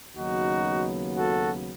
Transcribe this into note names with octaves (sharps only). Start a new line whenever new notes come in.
D#2 C#3 F#3 B3 D#4 F#4
F#4 A4